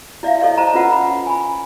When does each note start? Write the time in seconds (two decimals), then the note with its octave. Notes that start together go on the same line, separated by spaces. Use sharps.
0.23 E4 D5 E5 F5
0.40 E4 A4 C#5 D#5 F5
0.57 C5 A5 A#5
0.74 C#4 F4 B4 F#5
0.92 B5
1.26 G#5 B5